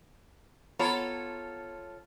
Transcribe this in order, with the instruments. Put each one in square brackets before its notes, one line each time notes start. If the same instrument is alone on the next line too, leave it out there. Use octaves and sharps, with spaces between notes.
[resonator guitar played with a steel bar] B3 A#5 [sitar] F4 A4 C#5